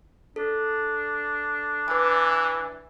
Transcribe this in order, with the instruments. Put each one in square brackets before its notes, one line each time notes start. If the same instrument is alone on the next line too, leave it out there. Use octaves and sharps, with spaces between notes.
[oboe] D4 [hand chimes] A4
[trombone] E3 [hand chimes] B4 D6